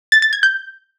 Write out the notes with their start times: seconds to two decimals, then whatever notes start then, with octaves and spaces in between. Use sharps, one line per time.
0.12 A6
0.22 A6
0.33 G#6
0.43 G6